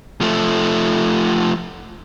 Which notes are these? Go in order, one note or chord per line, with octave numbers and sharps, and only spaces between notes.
F3 A3